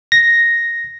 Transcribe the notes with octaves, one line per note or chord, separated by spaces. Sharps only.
A#6